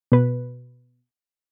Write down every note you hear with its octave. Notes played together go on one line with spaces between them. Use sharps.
B2 B4